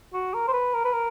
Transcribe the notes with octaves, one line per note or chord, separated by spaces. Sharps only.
F#4
A#4
C5
B4
A#4
B4
A#4